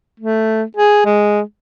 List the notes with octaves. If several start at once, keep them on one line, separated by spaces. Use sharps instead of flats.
A3
G#4
G#3